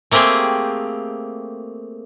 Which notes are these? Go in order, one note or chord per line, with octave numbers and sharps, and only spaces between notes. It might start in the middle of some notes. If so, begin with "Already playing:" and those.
A3 A#3 C4 G4 G#4 G5